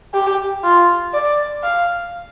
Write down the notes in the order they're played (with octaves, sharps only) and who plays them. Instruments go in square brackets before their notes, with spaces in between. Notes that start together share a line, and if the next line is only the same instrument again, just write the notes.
[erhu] G4
F4
D5
F5